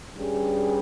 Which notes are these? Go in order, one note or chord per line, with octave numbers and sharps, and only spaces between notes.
G2 G3 C#4 G#4